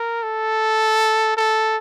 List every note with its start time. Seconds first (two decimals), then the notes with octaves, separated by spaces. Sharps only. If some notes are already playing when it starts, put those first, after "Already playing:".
Already playing: A#4
0.23 A4
1.37 A4